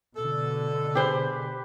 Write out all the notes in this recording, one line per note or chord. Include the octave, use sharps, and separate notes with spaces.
B2 D3 A4
G4 G#4 B4 C5